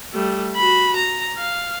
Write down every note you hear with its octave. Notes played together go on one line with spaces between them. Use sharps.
G3 A3
F#4 B5
A#5
F5